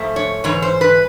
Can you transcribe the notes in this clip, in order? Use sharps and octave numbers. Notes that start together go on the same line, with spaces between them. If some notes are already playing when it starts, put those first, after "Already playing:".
Already playing: G#2 F3 A3
C#5
G#2 E3 C#5
C5
B4